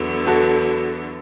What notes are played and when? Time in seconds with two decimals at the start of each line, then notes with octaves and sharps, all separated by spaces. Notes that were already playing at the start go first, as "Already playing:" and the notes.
Already playing: E2 D3 F#3 B3
0.27 F#4 A4